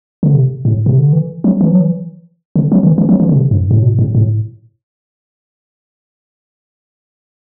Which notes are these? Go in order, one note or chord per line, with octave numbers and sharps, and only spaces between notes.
D3
C3
A2
C3
D3
E3
F#3
E3
F#3
E3
D3
F#3
D3
E3
E3
F#3
E3
D3
C3
G2
A2
B2
A2
A2